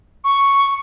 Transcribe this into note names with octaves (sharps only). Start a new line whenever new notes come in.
C#6